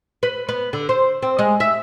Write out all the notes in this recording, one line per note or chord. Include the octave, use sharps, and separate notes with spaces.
B4
B3
D3
C5
C4
G#3
E5